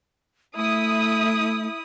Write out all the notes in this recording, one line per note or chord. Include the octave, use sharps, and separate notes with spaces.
A3 E4 D#6